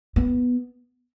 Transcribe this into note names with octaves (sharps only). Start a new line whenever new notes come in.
B3